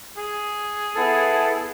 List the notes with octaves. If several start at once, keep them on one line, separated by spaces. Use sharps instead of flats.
G#4
B3 E4 A4